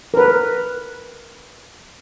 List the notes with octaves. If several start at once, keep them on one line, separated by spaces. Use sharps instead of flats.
A#4 B4